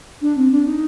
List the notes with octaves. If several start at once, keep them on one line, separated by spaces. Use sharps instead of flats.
D4
C4
D4
D#4